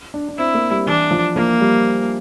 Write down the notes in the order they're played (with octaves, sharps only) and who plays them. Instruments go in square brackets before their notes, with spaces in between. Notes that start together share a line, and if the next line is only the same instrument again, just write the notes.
[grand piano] D4
D4
[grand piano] C4 [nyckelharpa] E4
[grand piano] A#3
G3
[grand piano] E3 [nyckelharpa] D4
[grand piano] F3
[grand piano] F3 [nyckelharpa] A#3
[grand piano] G3